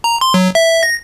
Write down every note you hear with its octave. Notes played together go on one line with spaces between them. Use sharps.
A#5
C6
F#3
E5
A#6